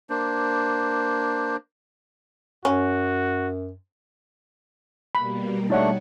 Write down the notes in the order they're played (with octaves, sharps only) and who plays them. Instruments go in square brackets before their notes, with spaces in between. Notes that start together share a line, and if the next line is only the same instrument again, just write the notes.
[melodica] A#3 D4 C5
[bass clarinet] F#2 [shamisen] C#4 [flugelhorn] F#4
[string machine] B2 G3 A#3 [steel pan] B5
[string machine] G3 [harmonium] A3 D4 [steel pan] D#4 C#5 F#5